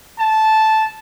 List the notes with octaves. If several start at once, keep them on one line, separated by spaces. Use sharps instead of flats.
A5